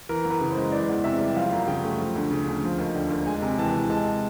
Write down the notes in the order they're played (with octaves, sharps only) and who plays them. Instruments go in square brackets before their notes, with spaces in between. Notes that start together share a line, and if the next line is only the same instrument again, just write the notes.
[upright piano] E3 A#4
F#2
B4
C#3
G#3 C5
E3 D5
E2
C3 E5
G3
F3 F5
F#2
C#3 G5
A3
F3
D2
C#3
D2
F3
D#2
D3
D#2
G#3 G#5
C3
E3 A5
C3
G#3 A5